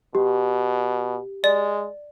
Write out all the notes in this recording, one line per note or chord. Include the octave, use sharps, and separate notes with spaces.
B2 G4
G#3 D5